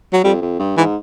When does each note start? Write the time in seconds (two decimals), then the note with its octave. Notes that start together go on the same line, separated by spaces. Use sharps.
0.13 F#3
0.24 F2 G3
0.42 F2
0.59 G2
0.78 G#2 E3